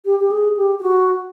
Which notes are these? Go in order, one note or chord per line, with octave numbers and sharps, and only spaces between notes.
G4
G4
G#4
G4
G4
F#4